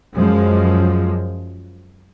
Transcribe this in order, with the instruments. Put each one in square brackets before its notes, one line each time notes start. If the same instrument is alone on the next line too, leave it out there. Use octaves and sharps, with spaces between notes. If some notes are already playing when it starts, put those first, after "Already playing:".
[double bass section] F#2 F3 G#3